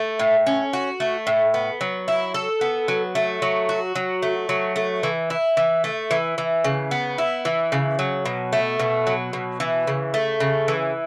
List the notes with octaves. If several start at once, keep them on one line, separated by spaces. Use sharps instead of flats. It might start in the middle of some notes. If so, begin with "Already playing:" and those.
Already playing: A3
A2
C#4
F#4
A3
A2
B3
F#3
E4
A4
B3
F#3
A3
F#3
F#4
F#3
A3
F#3
A3
E3
E4
E3
A3
E3
E3
C#3
B3
E4
E3
C#3
F#3
B2
A3
B2
F#3
B2
E3
C#3
A3
C#3
E3